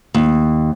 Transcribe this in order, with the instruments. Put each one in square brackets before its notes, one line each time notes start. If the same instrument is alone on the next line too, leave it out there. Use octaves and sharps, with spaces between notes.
[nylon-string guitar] D#2